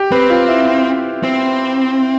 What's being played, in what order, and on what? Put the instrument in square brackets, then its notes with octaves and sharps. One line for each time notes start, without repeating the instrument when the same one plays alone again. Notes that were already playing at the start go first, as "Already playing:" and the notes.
Already playing: [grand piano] G4
[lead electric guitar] C4 [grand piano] B4
[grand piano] F4
E4
[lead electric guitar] C4